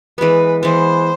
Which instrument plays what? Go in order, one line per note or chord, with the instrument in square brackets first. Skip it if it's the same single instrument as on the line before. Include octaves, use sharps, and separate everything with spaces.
[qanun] E3 G#3 B3 [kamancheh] B4
[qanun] E3 G#3 B3 [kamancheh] C5